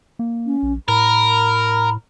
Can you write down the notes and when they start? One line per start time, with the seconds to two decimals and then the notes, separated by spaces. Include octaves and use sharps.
0.19 A#3
0.46 C#4
0.63 A#1
0.88 A2 A#4 B5